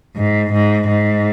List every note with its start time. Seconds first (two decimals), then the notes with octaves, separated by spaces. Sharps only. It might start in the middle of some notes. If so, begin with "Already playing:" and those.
0.16 G#2
0.52 G#2
0.88 G#2